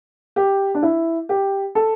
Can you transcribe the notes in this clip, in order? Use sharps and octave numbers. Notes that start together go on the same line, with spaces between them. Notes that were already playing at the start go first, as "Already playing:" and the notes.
G4
D4
E4
G4
A4